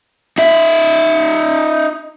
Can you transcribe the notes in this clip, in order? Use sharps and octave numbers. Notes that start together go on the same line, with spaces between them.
D#4 E5